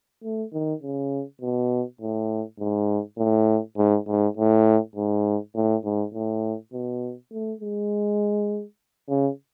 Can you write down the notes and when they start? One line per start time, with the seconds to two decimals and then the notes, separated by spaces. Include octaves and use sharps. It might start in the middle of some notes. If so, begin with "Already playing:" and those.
0.24 A3
0.53 D#3
0.82 C#3
1.42 B2
2.01 A2
2.59 G#2
3.18 A2
3.77 G#2
4.07 G#2
4.37 A2
4.96 G#2
5.56 A2
5.84 G#2
6.14 A2
6.73 B2
7.32 A3
7.61 G#3
9.09 C#3